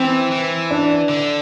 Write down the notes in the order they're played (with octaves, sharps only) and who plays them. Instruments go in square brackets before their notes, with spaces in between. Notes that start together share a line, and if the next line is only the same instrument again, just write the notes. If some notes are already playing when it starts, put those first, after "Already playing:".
Already playing: [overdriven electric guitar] E3 [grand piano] C4
[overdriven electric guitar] E3
[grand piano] D4
[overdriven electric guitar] D3